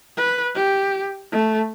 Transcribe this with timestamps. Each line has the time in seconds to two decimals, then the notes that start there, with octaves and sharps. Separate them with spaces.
0.17 B4
0.55 G4
1.32 A3